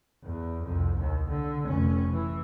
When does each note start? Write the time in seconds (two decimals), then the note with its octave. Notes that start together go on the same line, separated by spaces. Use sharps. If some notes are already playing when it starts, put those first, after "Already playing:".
0.24 E2
0.63 C2 F2
0.99 D#2
1.29 D3
1.67 F1 C#4
2.12 E3